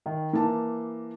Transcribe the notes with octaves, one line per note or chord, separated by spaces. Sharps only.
D#3
E3 A#3 A5